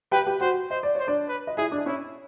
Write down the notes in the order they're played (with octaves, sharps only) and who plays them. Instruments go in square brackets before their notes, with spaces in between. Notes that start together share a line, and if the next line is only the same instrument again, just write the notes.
[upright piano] G4 G5 [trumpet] B4
[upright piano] G4 G5
[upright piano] F#4 F#5 [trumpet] C5
[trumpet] C5 [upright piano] D#5
[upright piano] D5
[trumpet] C5 [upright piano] C#5
[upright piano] D4 D5
[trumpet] B4
[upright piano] D#5
[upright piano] E4 E5 [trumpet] G#4
[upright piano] D4 D5
[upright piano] C#4 C#5 [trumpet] E4